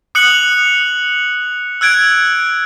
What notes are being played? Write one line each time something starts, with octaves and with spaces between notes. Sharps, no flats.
D#6 F#6 C#7 F#7
E6 F#6 G#6 D7